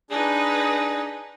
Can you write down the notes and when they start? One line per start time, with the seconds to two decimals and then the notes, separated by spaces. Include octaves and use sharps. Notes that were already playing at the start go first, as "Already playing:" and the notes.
0.11 D4 D#4 G#4 B4